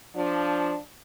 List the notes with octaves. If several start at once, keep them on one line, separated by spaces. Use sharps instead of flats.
F3 D4